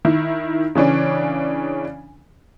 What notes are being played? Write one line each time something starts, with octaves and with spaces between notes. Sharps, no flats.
D#3 E4
C#3 E3 C#4 D4